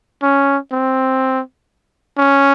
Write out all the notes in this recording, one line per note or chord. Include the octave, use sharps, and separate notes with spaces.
C#4
C4
C#4